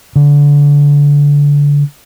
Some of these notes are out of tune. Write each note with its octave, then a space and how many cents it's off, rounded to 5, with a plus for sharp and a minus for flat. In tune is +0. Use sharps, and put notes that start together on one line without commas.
D3 -25